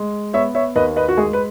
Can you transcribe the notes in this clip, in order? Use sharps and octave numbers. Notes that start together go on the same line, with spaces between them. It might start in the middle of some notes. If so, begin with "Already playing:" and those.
Already playing: G#3
B3 C#5 E5
C#5 E5
D#2 B4 D#5
B4 D#5
F#4
G#3 G#4
B4